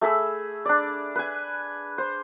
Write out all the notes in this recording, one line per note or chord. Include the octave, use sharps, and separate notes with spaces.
A3 G#4 B5 E6
D4 D5
B4 G#5
C5